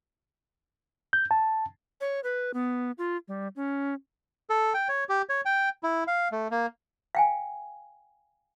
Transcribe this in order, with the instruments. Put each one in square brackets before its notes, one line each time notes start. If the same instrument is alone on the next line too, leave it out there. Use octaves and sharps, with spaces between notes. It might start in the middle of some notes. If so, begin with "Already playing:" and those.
[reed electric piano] G6
A5
[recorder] C#5
B4
B3
F4
G3
C#4
[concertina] A4
G5
C#5
G4
C#5
G5
E4
F5
A3
A#3
[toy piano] F5 G5 G#5